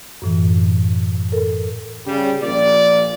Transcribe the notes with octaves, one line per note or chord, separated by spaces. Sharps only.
F#2 A2 E3
A4 A#4
C#3 G3
A#1 A#2 D5